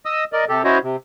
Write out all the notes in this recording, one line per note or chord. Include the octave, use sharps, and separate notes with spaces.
D#5 D#6 E6
A#4 D5 D#5
C3 G4 A4
C#4 E4 F#4 C5 C#5 D#5
C3